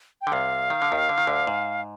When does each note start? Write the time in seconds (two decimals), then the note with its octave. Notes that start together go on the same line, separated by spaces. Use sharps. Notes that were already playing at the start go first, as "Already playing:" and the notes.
0.21 G5
0.27 D3
0.32 C2 C3 F5
0.70 D#3
0.82 D3
0.92 D#2 D#3
1.09 D3
1.18 D#3
1.27 D2 D3
1.47 G#2